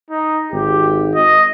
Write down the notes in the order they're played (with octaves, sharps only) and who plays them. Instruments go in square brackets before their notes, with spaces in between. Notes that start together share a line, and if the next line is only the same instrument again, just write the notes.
[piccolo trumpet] D#4
[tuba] G#1 [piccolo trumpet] G4
[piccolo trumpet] D#5